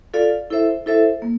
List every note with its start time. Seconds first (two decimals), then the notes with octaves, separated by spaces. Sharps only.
0.14 F4 A4 D5 F5
0.50 E4 A4 C5 E5
0.86 E4 A4 C5 E5
1.22 A#3